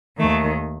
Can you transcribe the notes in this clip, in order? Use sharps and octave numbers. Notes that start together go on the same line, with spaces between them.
D#2 D#3 A3